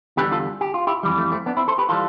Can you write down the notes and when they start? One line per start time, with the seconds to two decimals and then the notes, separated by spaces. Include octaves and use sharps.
0.17 E2 D3 G3 G4 B4
0.32 F4 A4
0.61 G4
0.74 F4
0.87 E4 G4
1.03 F2 E3 G3
1.18 A3
1.32 A3 C4
1.46 B3 D4
1.57 C4 E4
1.68 A4 C5
1.78 G4 B4
1.89 E3 G3 F4 A4